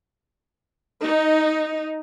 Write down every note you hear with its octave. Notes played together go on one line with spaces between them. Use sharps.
D#4